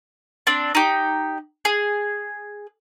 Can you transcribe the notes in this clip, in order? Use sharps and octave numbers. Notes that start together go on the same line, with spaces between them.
C4 D4
D#4 G4
G#4